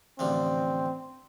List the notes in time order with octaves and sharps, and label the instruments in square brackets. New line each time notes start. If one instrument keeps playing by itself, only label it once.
[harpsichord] A1 D3 F3 [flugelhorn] C4